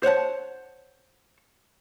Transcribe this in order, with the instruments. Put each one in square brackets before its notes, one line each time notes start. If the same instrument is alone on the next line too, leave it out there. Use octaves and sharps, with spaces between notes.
[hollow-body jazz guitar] C5 C#5 F#5 A5